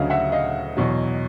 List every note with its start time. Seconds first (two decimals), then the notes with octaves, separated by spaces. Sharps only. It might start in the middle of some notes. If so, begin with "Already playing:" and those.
Already playing: D2 C#3 F#3 D#5 F5
0.10 E5 F#5
0.32 D#5 F5
0.77 E2 B2 F#3